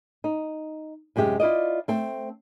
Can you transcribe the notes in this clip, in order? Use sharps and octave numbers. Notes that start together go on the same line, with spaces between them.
D#4
F#2 C3 G#3 G4 E5
E4 F4 D5 D#5
A3 C4